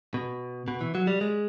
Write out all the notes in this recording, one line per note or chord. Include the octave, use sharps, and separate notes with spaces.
B2
B2
E3
F#3
G3
G#3